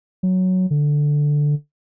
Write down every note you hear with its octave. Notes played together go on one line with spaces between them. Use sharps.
F#3
D3